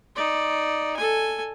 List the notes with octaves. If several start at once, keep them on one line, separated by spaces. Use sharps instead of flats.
D#4 D5
A4 G#5